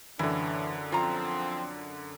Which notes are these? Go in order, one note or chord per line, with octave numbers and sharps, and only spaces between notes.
F#2 A2 D3 E3 D4
F3 C4 F4 A#5